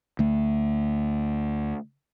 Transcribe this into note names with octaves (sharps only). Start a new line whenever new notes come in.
D2 A3